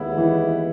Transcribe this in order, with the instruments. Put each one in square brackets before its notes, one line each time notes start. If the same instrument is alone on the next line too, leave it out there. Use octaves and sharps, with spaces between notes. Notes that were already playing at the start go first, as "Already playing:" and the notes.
Already playing: [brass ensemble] D#2 C#3 G#3 B3 E4
[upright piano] E3